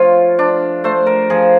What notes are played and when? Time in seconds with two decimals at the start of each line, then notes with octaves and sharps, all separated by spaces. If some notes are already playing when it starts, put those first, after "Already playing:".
Already playing: F3 A3 F4 C#5
0.39 D4
0.84 A3 C5
1.06 A#4
1.30 F3 G#4